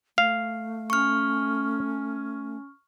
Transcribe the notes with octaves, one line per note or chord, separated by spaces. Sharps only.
A3 F5
C#4 C#6 F6